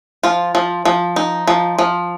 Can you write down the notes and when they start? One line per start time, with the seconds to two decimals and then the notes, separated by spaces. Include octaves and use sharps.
0.23 F3 F4
0.55 F3
0.85 F3
1.16 D#4
1.47 F3
1.78 F3